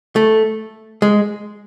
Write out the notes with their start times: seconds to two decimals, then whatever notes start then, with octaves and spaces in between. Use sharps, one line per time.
0.16 A3
1.02 G#3